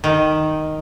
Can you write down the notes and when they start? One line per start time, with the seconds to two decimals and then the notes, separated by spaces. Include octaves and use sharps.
0.04 D#3